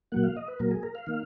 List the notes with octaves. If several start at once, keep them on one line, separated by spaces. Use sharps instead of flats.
A#2 F#3 A#3 F#5
F5
D#5
B4
A#2 F#3 A#3 A#4
G#4
A#4
F5
D#3 A#3